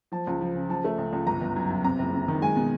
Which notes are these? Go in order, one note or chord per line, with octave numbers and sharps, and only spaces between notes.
F3 A5
C#2
F3
C#3
F3 A5
A3
C#2
C#2
G1 A#5
G1
F#2
F#2
C3 A#5
F#1
C3
D#3
G#3 G#5
B2